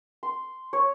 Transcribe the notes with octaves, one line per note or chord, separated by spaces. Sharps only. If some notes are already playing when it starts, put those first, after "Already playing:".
C6
C#5